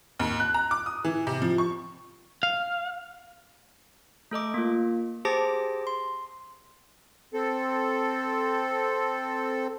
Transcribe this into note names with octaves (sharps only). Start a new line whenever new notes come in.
D#2
F#6
A#5
D6
D#6
E3
C3
F3
C#6
F5
A3 A4 D#5 D6
A#3 F4
G4 G#4 C5 A5 D6 A#6
C6
C4 A4